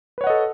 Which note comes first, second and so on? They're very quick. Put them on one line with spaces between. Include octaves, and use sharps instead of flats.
B4 C#5 F#5 D#5 A4